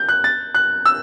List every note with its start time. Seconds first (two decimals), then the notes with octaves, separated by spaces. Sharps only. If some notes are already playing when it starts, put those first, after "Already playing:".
Already playing: G6
0.09 F#6
0.24 A6
0.55 F#6
0.86 E6